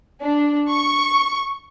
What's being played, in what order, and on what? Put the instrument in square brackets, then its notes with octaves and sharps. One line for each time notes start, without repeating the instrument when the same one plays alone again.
[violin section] D4
C#6